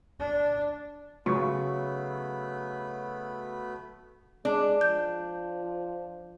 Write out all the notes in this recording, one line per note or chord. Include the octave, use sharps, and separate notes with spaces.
D4
C#3 F#3 A3 B3 B5 C#6
G#3 D4
F3 G6